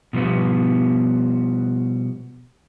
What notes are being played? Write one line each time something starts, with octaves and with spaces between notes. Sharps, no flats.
B2 F3 G3 B3